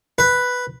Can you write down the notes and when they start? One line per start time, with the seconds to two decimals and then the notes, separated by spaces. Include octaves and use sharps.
0.18 B4